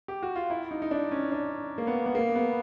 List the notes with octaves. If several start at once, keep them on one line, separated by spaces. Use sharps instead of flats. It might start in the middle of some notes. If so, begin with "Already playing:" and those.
G4
F#4
F4
E4
D#4
D#4
D4
C#4
D4
A#3
B3
B3
A#3
B3